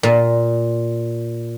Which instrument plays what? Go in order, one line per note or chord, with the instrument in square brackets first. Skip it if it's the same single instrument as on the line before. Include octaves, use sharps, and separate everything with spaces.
[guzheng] A#2